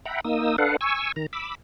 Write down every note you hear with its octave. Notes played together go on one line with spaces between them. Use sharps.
E5 F#5 G5 A#5 B5
A#3 D#4 D#6 E6
D4 A4 B4 F5 F#5
G#5 C#6 E6
D#3 A#5
B5 D6 E6